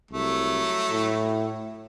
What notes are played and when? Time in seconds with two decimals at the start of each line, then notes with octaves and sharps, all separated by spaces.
0.11 C2 F#3 A3
0.91 A2